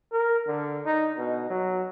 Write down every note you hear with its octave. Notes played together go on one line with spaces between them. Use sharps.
A#4
D3
D#4
B2
F#3